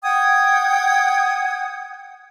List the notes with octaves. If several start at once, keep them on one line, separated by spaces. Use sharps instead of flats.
F#5 G5 D#6 G#6